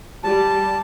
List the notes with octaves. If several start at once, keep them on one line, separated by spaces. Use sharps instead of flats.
G3 A5